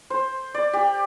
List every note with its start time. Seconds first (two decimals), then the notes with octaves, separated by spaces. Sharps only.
0.10 C5
0.54 D5
0.73 G4